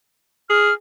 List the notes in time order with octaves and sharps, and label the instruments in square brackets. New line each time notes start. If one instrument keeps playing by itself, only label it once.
[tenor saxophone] G#4 [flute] F6